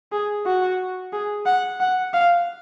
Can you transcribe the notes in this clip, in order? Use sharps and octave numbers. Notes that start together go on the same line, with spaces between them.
G#4
F#4
G#4
F#5
F#5
F5